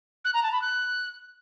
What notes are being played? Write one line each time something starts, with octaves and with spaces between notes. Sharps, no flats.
F#6
A#5
A5
B5
F#6